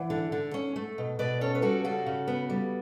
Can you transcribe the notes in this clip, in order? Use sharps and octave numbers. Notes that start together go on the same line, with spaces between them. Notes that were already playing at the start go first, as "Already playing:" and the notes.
Already playing: E3 D5 F#5
D3
D3
C#4
A3
B2
B2 B4 D5
C#4 A4 C#5
B4
G3 F#4 A4
C#3 F#4 A4
C#3
B3
G3